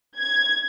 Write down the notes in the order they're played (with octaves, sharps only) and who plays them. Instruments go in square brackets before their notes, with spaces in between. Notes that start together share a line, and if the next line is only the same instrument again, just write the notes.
[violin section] G#6